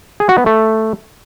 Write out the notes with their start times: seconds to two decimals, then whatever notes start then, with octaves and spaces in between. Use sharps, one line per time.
0.20 G#4
0.29 F#4
0.38 B3
0.46 A3